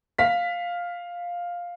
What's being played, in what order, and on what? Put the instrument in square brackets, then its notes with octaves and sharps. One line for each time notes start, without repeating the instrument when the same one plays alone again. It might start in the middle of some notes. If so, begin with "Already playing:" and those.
[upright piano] F5 B6